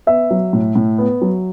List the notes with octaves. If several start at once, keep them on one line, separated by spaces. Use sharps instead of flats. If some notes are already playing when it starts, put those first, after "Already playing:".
B3 E5
F#3
A2
A2
B3
F#3